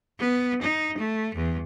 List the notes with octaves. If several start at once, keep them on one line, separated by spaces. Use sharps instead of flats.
B3
D#4
A3
E2